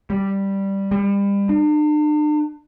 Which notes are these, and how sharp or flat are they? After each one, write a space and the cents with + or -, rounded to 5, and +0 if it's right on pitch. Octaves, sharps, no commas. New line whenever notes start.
G3 +0
G3 +35
D4 +45